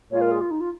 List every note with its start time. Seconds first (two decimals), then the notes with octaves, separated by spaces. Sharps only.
0.11 A#2 G#3 F4 C#5
0.21 A#4
0.31 G#4
0.41 F4
0.51 D#4
0.60 F4